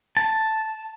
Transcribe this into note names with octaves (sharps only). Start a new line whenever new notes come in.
A5